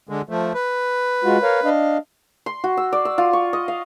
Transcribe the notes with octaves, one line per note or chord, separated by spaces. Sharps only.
D3 G#3
F3 A3
B4
G#3 F4 F#4
A#4 C#5 F5
D4 D#5 F5
C6
F#4
E6
D5
E6
F4
C#6
D#5
F5